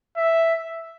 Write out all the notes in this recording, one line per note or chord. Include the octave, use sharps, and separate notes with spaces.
E5